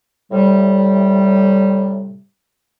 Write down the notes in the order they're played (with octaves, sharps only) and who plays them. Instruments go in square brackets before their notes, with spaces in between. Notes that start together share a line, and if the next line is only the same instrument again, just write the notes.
[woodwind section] A2 C3 G3